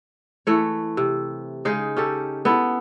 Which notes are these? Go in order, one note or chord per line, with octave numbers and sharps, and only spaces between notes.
E3 A3 C#5
C3
C#3 G#3 D#4 G#4
C#4 G4 A4
B3 E4 A4 B4